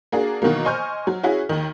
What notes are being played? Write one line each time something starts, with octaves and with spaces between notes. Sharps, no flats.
A#3 D4 F#4 G#4
B2 D#3 E3 F#3 A#3
C5 D#5 G#5 C#6 F6 G6
F#3
C#4 E4 F#4 G#4
D#2 D#3